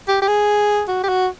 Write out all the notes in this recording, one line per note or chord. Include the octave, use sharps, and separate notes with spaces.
G4
G4
G#4
F#4
G4
F#4